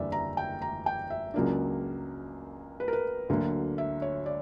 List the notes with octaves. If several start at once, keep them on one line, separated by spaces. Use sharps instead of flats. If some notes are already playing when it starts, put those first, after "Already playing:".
Already playing: F#1 E2 D3 G3 D5 E5
A#5
G5
A#5
G5
E5
C#2 C#3 F#3 A#3 D4
B4
A#4
B4
D2 D3 F#3 A#3
E5
C#5
D5